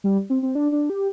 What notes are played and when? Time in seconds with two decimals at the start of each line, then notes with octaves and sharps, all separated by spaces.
0.04 G3
0.30 C4
0.43 C4
0.55 D4
0.72 D4
0.90 G4